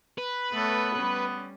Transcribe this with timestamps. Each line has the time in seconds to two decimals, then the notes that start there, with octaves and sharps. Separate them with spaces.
0.18 B4
0.53 A3 B3 A4 C#5
0.95 G3 C#4